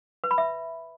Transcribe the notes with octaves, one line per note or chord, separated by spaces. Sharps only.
B4
B5
E5